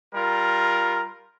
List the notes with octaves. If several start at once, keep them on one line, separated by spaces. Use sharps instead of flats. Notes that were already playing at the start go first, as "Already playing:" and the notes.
G3 F4 A#4